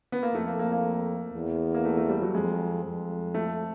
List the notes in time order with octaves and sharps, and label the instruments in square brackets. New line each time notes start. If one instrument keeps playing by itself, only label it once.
[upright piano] B3
A#3
[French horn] F2 [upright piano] A3
[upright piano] A#3
A#3
A#3
[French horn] E2
[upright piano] A#3
A3
A3
G3
F#3
[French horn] F2 [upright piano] G#3
[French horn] F2
[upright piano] A3